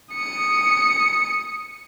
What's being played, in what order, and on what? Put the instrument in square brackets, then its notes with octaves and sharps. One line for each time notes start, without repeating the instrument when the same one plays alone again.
[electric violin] D#6 C#7